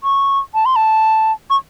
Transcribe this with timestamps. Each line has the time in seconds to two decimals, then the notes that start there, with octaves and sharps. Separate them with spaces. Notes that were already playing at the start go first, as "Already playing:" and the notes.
0.04 C#6
0.54 A5
0.65 C6
0.76 A5
1.50 C#6